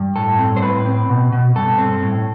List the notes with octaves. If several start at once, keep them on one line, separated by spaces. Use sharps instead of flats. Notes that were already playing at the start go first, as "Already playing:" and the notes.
Already playing: G2
A2 A4
C4
C5
A2 B4
C4
B2
B2
G2 A4
C4
A2